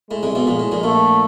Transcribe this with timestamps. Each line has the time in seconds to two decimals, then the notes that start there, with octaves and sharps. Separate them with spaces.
0.10 A2 G#3
0.23 C2 C3
0.35 B1 B2
0.47 A#1 A#2
0.59 A2
0.72 A#1 A#2
0.83 A#1 A#2 A3